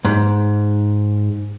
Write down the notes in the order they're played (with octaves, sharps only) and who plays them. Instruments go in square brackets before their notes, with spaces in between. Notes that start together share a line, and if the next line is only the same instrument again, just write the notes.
[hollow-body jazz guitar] G#2